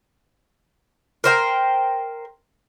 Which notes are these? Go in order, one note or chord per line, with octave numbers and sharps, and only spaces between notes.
A#4 C5 G5